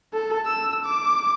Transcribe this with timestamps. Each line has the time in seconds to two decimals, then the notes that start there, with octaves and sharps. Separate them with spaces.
0.14 A4
0.46 E6
0.85 D6